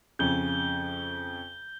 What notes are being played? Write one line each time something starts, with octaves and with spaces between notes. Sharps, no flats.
F2 C#3 G6 G7